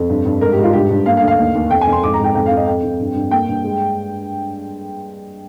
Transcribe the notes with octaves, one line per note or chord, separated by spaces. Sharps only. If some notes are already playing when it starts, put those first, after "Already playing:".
Already playing: F2
G2
G2
G#2 A#4
G4
G#2 F4
G2 G4
G2
A#3 F5
F5
D2
F5
D#2
D#2
F2 G5
G#5
F2
C6
G#2 D6
A#5
G#2
G5
F2 G5
F5
F2
D#5
F2 G5
F2
G2
G2
A#3 G5
G2
G#3